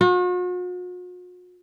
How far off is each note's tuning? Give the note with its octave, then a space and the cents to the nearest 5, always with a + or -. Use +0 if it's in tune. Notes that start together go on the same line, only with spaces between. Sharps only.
F#4 -45